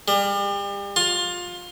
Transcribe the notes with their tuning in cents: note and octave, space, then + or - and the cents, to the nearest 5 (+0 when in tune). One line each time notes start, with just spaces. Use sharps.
G3 +35
F4 +20